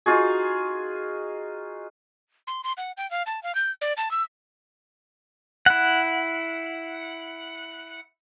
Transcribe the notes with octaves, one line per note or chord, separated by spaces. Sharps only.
D#4 F4 F#4 G#4
C6
C6
F#5
G5
F5
A5
F5
G6
D5
A5
E6
E4 F#5